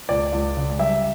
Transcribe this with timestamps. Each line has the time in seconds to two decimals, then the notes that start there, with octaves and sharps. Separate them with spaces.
0.09 C#2 D5
0.33 C#2
0.57 C#3
0.79 G3 E5